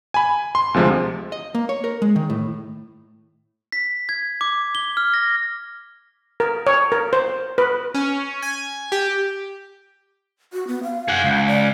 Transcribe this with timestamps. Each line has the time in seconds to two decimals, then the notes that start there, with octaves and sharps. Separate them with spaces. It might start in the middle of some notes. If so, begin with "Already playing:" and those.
0.14 G#5 B5
0.55 C6
0.74 D2 C3 F3 G#3
1.32 D#5
1.55 A#3
1.69 C#5
1.84 A#4
2.02 G#3
2.16 D#3
2.30 A2
3.72 B6
4.09 G#6
4.41 D6
4.75 G7
4.97 F6
5.14 A#6
6.40 A#4
6.67 C#5
6.92 A#4
7.13 C5
7.58 B4
7.94 C#4
8.42 G#5
8.92 G4
10.53 F#4
10.67 B3
10.83 F5
11.08 G#4 F#5
11.24 C#2
11.47 D5